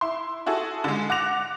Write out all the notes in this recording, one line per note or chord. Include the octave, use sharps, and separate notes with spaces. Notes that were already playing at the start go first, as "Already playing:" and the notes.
E4 C6
E4 F#4 G#4 A4
D3 G#3
F#5 D6 F#6 A#6 F7